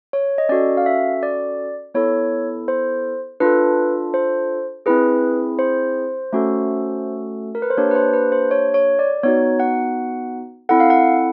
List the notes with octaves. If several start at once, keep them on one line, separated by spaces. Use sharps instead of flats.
C#5
D#5
C#4 F#4 A4 D5
F5
E5
D5
B3 E4 A4 C#5
C5
D4 F4 A4 B4
C5
C4 E4 G#4 B4
C5
A3 C#4 F#4 A4
A#4
B4
C5
A#3 D4 G4 C#5
B4
C5
B4
C5
C#5
C#5
D5
B3 D#4 F#4 C#5
F#5
C4 E4 A4 F#5
F5
F#5